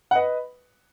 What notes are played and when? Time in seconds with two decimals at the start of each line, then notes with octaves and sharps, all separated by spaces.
0.11 F#5
0.15 B4 D#5